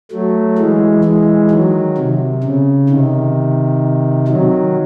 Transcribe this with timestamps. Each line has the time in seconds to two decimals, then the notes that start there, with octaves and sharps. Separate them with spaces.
0.11 F#3 A3
0.58 E3 G#3
1.04 E3 G#3
1.51 D#3 F#3
1.98 C3
2.44 C#3
2.89 C3 D#3
4.28 D#3 F#3